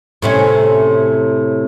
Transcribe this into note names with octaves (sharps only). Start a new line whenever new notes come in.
A2 C3 C#4